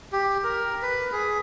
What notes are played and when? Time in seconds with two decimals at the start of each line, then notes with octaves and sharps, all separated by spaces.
0.13 G4
0.44 A#4
0.82 B4
1.12 G#4